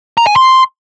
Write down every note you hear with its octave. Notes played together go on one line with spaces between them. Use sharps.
A#5
G#5
C6